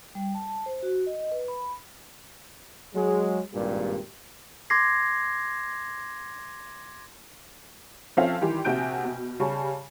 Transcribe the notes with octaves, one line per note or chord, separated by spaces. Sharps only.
G3
A5
C5
F#4
D#5
B4
B5
F#3 G#3
G#1 G2 A#2 G4
C6 D6 G#6 A#6 C7
F3 C4 C#4 A4 E5 F5
D#3 E3 G3 G4 C6
A#1 C3 F#4 G6 D7
B2
C#3 G3 A5 C#6